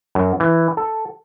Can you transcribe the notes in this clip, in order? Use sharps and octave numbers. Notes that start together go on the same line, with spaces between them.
F#2
E3
A4